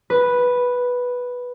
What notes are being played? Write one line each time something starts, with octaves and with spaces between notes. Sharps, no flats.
B4